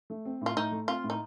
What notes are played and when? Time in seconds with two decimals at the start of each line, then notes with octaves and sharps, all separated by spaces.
0.10 A3
0.25 C4
0.41 A2 F4
0.56 A2 D#4
0.72 A3
0.88 C4 F4
1.04 A2
1.10 D#4